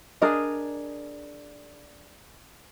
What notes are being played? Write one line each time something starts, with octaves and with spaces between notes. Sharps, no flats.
D4 G#4 A#4 D#5